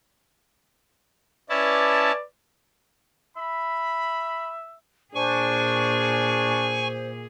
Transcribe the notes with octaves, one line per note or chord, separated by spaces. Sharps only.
C#4 E4 B4 D5 A5
E5 B5
A#2 D4 G#4 C5 G#5 C#6